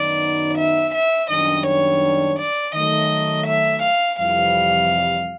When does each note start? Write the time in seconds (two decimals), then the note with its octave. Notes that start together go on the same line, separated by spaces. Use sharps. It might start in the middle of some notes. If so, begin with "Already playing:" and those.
Already playing: F#2 D#3 F#3 B3 D#4 D5
0.58 E5
0.94 E5
1.30 F#2 D#3 G3 B3 D4 D#5
1.66 C#5
2.39 D5
2.75 D#3 F#3 A3 D#5
3.46 E5
3.82 F5
4.18 F2 C3 E3 G3 F5